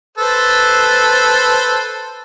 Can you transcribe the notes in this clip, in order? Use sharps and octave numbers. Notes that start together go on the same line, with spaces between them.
A4 B4 C5